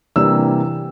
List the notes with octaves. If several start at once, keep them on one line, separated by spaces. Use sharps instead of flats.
C3 E3 G3 A#3 D4 E6